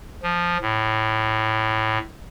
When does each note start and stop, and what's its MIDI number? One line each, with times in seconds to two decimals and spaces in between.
0.23 0.57 53
0.61 1.98 45